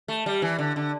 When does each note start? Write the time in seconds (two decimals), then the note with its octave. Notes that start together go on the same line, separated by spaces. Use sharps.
0.08 A3
0.26 G3
0.42 E3
0.59 D3
0.76 D3